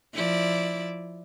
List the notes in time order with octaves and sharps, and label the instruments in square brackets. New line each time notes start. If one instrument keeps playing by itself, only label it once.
[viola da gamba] F3 E4 D5